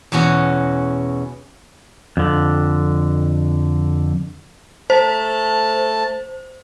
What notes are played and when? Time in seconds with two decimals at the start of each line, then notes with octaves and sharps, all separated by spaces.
0.12 E2 B2 C#4 F#4
2.17 F2 D3
4.90 A3 C5 A5